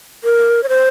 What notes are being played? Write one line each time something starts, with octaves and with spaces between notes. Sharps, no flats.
A#4
C#5
C5